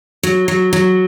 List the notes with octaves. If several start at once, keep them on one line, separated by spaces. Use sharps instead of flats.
F#3
F#3
F#3